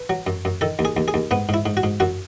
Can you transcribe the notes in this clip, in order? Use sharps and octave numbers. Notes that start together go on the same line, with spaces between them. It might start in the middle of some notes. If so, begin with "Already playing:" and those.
Already playing: B4
F#3
F#2
F#2
D#3 A4
D#2
G#4
D#2
G#4
D#2
G#2 B3
G#2 E4
G#2
F#4
G#2
F#2 F#4